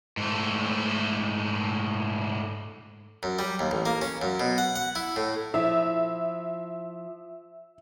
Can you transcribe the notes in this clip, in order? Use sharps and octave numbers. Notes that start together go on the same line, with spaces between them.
G#2 A3
F#2
G3
D#2
A1
A#3
C#4
F#2
B2
F#5
F#5
E4
A2
F3 E4 E5